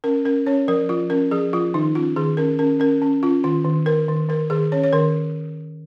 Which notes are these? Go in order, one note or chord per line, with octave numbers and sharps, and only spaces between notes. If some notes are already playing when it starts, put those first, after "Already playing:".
C#4 A#4
C#4 A#4
C#4 C#5
F3 A#4
F3 F4
C#4 A#4
F3 G#4
F3 F4
D#3 D#4
C#4 F4
D#3 G#4
C#4 A#4
C#4 A#4
C#4 A#4
C#4
C#4 F4
D#3 F4
D#3
D#3 A#4
D#3
D#3 A#4
D#3 G#4
C#4 C#5
C#5
D#3 A#4